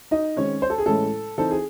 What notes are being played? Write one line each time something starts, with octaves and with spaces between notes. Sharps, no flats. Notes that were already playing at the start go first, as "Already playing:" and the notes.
D#4 D#5
D#3 G#3 C4 C#4 C#5
C5
A4
G#4
A2 E3 G#3 C#4 E4 A4
E3 C4 D#4 A4
G#4